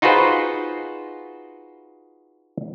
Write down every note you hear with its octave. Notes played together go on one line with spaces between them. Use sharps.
D#4 F4 F#4 G#4 B4 C5